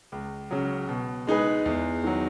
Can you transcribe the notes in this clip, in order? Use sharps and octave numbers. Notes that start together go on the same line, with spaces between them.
C#2
C#3 F#3
B2
G#3 D#4 G#4 B4
E2
D#3 F#3